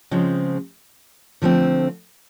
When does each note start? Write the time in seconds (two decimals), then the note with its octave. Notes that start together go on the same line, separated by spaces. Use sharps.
0.11 C#3 F3 G#3 C4
1.42 D3 F3 A3 C4